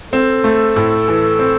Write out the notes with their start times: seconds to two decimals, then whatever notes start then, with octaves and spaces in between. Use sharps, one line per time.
0.13 C4 A4
0.44 A3
0.76 A2
1.08 E3
1.39 C4